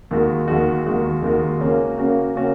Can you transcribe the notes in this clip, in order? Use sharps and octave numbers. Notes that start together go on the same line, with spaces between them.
D#2 D#3 G#3 F#4
D#2 D#3 G#3 F#4
D#2 D#3 G#3 F#4
D#2 D#3 G#3 F#4
C#3 A#3 C#4 F#4
C#3 A#3 C#4 F#4
C#3 A#3 C#4 F#4